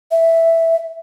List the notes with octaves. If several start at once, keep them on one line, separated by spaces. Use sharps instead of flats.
E5